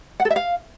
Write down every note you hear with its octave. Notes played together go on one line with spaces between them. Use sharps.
F#5
A4
E5
F5